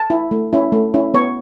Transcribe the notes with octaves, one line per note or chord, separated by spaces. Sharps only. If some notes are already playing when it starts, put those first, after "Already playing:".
Already playing: A5
E4
A3
C#4 E4
A3
C#4 E4
B3 C#5